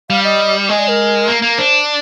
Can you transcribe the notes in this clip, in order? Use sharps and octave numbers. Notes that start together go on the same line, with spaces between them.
G3 F5
D#5
G#3 D#5
D5
A#4
A#3
A#3
D4 C5